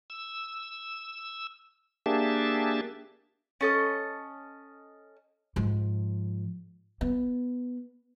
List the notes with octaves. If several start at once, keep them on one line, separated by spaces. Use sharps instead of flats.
E6
A#3 D4 G4 G#4 E5 A5
C#4 A4 D#5
G#2 F3
B3